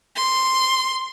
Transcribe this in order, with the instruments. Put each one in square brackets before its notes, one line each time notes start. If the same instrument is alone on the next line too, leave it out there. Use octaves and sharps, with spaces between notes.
[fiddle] C6